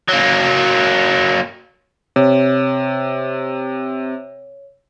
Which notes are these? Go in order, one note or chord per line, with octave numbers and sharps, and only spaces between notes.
F#3 A#3
C3 C#5